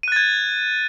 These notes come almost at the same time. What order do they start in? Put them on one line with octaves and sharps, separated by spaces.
D#7 F#6 A6 G#6